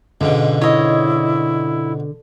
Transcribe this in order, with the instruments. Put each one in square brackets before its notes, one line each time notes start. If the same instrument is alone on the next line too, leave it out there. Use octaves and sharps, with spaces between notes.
[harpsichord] C#2 G#2 B2 [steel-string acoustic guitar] D3
[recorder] E4 [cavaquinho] C#5 D#5